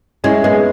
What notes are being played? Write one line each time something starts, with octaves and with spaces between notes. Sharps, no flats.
G#3 C#4 E4
G#3 B3 D#4